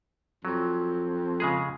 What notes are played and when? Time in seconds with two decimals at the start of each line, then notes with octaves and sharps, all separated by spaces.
0.45 F2 F#3
1.40 C#3 G#3 G#4